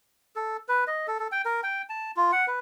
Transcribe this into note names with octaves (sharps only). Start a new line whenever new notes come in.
A4
B4
D#5
A4
A4
G5
A#4
G5
A5
F4
F#5
B4